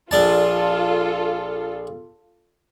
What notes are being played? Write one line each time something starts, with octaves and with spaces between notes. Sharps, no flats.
A#1 D4 F4 A4 A5